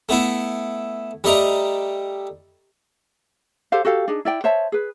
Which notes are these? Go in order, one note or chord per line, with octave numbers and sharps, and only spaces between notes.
A3 B3 E4
G3 A3 D#5 A#5 D6
G4 A4 C5 F5
F#4 G4 A4 F5
D4 D#4 G#4
E4 D5 G5
C5 C#5 E5 A5
G#4 B4